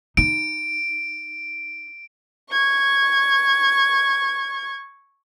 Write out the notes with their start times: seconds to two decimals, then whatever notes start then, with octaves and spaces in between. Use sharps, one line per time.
0.17 D#4 D7
2.50 C#6 G#6